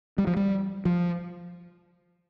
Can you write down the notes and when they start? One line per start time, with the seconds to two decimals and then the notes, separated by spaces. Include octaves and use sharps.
0.18 G3
0.27 F3
0.37 G3
0.85 F3